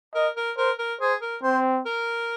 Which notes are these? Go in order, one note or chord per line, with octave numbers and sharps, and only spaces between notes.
A#4 D#5
A#4
A#4 C5
A#4
G#4 C5
A#4
C4 C5
A#4